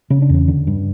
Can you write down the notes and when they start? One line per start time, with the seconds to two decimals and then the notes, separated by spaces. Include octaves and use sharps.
0.10 C#3 C#4
0.22 D4
0.30 E2 C#4
0.48 D3
0.67 G2